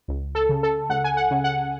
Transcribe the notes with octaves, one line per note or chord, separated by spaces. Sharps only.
C#2
A4
C#3
A4
C#2 F#5
G#5
F#5
C#3
F#5